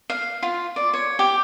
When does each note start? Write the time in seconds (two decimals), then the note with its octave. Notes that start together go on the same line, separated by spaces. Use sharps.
0.10 F5
0.43 F4
0.76 D5
0.94 C#5
1.19 G4